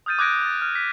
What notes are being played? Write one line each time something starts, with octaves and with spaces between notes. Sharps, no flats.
D#6 F6 G6 A6 D#7
D6 D#6 F#6 G#6 A#6 D7
D#6 A6
F6
B6